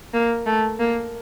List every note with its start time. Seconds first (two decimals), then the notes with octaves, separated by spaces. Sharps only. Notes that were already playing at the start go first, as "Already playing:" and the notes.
0.14 A#3
0.46 A3
0.80 A#3